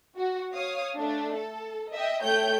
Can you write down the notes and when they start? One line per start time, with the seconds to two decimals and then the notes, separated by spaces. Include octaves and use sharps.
0.16 F#4
0.55 C#5 F5 D#6
0.96 A3 D4
1.35 A4
1.93 D#5 E5 G5
2.22 A3 C#5 G5 G6